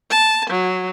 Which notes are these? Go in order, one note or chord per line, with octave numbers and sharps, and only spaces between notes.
A5
F#3